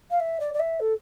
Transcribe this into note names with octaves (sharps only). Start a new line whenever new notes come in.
F5
E5
D5
D5
E5
A4